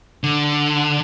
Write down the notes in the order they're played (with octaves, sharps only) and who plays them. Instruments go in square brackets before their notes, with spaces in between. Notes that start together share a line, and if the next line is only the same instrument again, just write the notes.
[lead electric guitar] D3